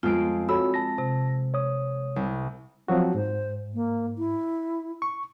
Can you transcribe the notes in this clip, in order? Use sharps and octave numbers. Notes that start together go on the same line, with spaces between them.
F2 G#3 B3 F4 D7
F#4 A4 C#5 B5 E6
A5 A#6
C3
C#5 D#6
C2
F3 F#3 C4 F#4
G#2 C5
A#3
E4
C#6